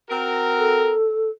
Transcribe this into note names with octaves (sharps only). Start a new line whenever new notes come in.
C4 F#4 A#4
A4